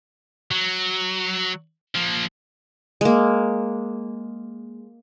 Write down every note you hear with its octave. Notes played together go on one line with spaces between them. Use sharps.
F#3
F3 A#3
G#3 A#3